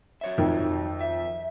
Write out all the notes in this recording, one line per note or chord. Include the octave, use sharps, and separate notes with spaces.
F#3 C#5 E5
F2 D#3
E5